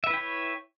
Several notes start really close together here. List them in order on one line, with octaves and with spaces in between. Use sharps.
E5 B4 E4 G5 C#5